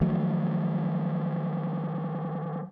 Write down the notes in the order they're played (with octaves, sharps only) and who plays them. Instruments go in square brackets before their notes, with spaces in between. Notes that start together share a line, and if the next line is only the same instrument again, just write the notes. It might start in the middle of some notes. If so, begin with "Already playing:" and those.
[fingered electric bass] D#3 F3 F#3 A3